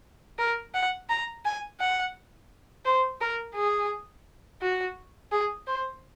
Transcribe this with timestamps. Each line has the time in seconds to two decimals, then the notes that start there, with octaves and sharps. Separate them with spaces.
0.39 A#4
0.74 F#5
1.10 A#5
1.45 G#5
1.80 F#5
2.85 C5
3.21 A#4
3.55 G#4
4.62 F#4
5.32 G#4
5.67 C5